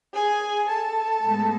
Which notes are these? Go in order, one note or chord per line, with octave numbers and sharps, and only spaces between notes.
G#4 G#5
A4 A5
A2 G#3 B3